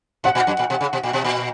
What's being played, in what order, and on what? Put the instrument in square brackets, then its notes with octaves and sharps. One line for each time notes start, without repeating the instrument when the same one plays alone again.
[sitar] B2 [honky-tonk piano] F#5
[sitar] A#2
F#2
A#2
B2
C#3
B2
A#2
B2
A#2